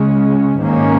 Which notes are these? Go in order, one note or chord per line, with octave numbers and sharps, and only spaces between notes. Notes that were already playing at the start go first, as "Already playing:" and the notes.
Already playing: C#3 G#3 C#4
G#2 D#3 A#3 C#4